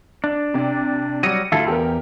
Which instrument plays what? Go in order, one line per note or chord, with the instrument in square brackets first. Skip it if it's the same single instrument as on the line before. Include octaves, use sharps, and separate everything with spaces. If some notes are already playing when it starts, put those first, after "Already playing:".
[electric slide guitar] D4
[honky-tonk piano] C3 D5
[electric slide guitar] F#3 G3 [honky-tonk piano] A#6 C#7 D#7
[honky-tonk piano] D2 A5 [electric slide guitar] E4 F4 A4
[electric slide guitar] E2 [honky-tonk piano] G4 A#4